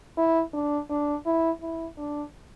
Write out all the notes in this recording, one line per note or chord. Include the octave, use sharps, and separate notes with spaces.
E4
D4
D4
E4
E4
D4